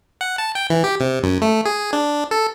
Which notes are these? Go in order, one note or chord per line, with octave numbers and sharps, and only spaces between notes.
F#5
A5
G5
E3
G4
C3
F#2
A3
G#4
D4
A4